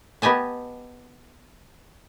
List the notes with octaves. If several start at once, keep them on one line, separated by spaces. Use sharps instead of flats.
B3 G4 D#5 G#5 A5